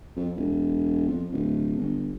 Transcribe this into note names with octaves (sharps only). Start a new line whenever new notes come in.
F2
E1
F2
D1
G1